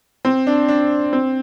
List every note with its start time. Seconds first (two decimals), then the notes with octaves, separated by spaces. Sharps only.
0.25 C4
0.47 D4
0.68 D4
1.13 C4